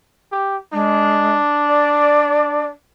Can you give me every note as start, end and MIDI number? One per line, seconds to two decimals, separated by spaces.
0.32 0.57 67
0.73 1.36 56
0.73 2.72 62
1.68 2.65 74